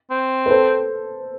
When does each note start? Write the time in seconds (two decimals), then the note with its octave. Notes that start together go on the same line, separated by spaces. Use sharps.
0.10 C4
0.46 B4
0.50 A4 C5